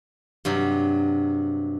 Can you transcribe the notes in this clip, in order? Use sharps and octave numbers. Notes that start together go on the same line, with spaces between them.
G2 C3 F#3